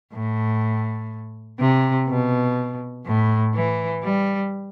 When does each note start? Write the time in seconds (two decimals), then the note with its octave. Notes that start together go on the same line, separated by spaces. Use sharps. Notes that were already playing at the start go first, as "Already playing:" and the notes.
0.14 A2
1.60 C3
2.08 B2
3.06 A2
3.54 E3
4.03 G3